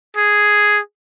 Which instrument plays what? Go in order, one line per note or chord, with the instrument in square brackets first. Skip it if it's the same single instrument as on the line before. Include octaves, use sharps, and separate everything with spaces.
[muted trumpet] G#4